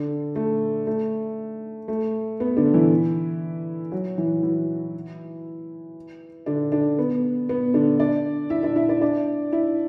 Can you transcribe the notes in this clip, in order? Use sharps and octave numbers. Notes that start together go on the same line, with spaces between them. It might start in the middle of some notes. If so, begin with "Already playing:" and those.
Already playing: D3 D4
A3
A3
A3
B3
D3 D4
E3 E4
F#3 F#4
E3 E4
E3 E4
D3 D4
D3 D4
B3
B3
D3 D4
D4 D5
E4 E5
D4 D5
E4 E5
D4 D5
D4 D5
E4 E5